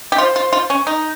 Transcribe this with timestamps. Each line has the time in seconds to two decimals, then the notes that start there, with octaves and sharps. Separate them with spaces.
0.12 G4
0.18 F4 C5
0.36 F4
0.53 F4
0.70 C#4
0.87 D#4